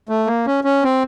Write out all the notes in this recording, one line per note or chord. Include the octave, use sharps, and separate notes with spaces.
A3
A#3
C#4
C#4
C4